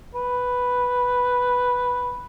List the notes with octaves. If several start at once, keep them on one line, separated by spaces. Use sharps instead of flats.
B4